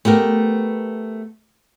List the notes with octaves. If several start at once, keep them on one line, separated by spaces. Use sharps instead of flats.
A3 B3 G4 A#4